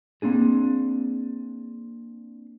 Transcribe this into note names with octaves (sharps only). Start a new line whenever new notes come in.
A#3 C4 D4 G#4